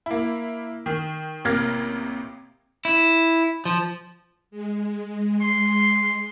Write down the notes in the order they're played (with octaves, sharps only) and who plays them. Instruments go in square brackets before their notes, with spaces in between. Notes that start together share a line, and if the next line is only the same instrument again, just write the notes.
[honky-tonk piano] A#3 E4
D#3
A1 C3 A#3 F6 G#6 A#6
[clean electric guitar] E4
F3
[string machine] G#3
[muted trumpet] C6